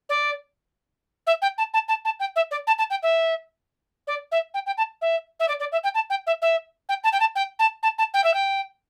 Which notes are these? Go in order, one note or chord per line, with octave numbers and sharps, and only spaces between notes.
D5
E5
G5
A5
A5
A5
A5
G5
E5
D5
A5
A5
G5
E5
D5
E5
G5
G5
A5
E5
E5
D5
D5
E5
G5
A5
G5
E5
E5
G5
A5
G5
A5
G5
A5
A5
A5
G5
E5
G5